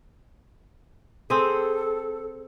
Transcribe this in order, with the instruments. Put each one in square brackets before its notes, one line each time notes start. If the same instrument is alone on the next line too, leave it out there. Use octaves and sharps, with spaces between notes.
[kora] C4 G#4 [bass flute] A4